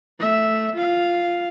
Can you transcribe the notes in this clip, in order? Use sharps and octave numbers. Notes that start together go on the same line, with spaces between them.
A3 E5
F4 F5